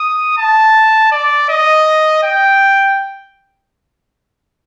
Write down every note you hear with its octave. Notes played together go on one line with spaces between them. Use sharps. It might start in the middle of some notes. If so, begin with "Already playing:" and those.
Already playing: D#6
A5
D5
D#5
G5